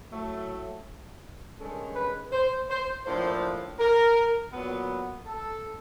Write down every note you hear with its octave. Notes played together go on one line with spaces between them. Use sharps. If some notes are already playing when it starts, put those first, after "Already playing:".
A2 F#3 A3
G2 D#3 G#3 C#4 A4
B4
C5
C5
A2 F3 A#3 D4 C5
A#4
A#2 F#3 B3
A4